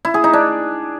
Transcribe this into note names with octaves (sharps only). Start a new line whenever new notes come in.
E4
G#4
D#4
D4